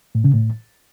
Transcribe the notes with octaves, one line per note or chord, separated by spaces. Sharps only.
A2
C#3
A2